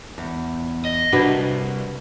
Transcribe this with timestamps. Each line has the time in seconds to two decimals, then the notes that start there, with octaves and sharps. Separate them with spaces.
0.18 E2
0.85 D#5
1.12 C2 D4 F#4 B4